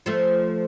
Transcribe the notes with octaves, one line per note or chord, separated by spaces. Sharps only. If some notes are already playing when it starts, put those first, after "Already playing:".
F3 A3